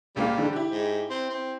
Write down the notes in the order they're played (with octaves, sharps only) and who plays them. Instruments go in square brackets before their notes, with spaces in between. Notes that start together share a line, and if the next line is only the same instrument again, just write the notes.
[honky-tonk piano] C#2 A#2 F5 [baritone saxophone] G3
[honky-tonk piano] D3
E4 G4
[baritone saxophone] G#2
C4
C4